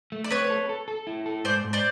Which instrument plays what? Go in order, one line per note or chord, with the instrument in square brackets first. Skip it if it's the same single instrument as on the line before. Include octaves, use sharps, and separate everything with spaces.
[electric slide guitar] A3
[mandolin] D5
[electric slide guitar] C4 [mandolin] B4 C#5
[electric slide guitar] A4
A4
A4
E4
A4
[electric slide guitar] G#2 [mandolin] C5 D5
[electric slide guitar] G#2
[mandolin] C5 D5